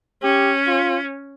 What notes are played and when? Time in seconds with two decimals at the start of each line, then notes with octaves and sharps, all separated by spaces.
0.23 C#4 G4
0.67 F4